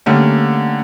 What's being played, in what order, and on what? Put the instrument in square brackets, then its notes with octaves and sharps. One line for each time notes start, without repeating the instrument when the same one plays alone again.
[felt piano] D3 G3 A3 A#3 C#4